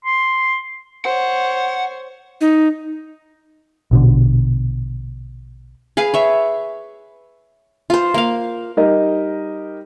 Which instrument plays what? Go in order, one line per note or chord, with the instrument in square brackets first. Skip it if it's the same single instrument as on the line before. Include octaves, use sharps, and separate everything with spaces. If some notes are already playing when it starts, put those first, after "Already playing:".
[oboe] C6
[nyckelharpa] C5 C#5 [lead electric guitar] F#5
[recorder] D#4
[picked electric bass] A#1 B2 D3
[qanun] G#4 B4 F5
C#5 E5
F4 C5
A#3 F5
[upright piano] G3 D#4 G4 A#4 D#5